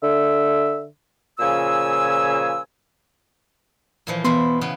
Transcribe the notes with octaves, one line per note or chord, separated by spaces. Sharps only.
D3 E5
A#2 C#3 F3 G#5 E6
A#2 E3 F3
B2 E3 B3 E4 C6
C#3 B3